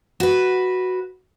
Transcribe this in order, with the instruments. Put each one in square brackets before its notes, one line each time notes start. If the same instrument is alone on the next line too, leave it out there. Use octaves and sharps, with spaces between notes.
[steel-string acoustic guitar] F#4 B4